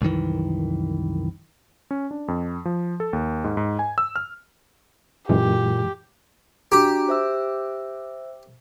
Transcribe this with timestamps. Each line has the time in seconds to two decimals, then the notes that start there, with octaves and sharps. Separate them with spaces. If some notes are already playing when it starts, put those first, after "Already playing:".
0.02 C2 F#2 D#3 E3
1.91 C#4
2.11 D4
2.28 F2
2.65 F3
3.00 A4
3.13 D#2
3.44 G#2
3.57 G#2
3.79 G#5
3.98 E6
4.16 F6
5.29 F#2 A#2 E3 G#3 G4
6.72 D4 F#4 G4 A#5
7.09 C5 E5 E6